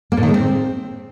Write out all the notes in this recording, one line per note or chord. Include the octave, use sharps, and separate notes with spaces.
A#3
A2
D#3
G#3
C4